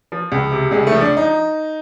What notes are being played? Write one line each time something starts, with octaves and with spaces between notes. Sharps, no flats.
F3
C#2
C3
C#2 G#3
A3
F3
D4
D#4